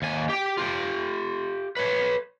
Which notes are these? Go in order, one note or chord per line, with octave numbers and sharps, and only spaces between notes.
D#2 G#5
G4 G5
F4 G4
B4 C#5